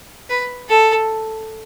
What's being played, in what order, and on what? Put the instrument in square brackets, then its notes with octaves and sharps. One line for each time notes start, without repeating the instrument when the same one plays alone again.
[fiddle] B4
A4